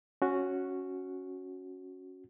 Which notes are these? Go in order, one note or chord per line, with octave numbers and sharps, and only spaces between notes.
C#4 F#4